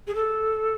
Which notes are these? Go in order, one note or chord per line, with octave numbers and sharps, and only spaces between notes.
G#4
A4